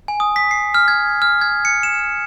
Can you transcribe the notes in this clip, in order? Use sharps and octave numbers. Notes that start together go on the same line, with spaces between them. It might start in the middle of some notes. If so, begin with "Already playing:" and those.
G#5
D#6
B6
C7
F6
G#6
F6
G#6
C#7
E7